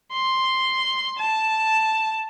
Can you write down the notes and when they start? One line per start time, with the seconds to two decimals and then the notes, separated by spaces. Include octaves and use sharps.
0.12 C6
1.19 A5